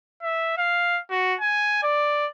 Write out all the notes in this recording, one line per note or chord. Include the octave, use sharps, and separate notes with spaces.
E5
F5
F#4
G#5
D5